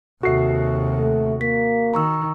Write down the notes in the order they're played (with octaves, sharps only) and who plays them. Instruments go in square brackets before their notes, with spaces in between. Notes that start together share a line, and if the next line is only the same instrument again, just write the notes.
[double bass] D#2 C3 [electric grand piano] F#4 C7 [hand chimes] A4 E5
[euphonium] A3
[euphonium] A#3 [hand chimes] B6
[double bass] D#3 [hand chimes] A#5 C#6 E6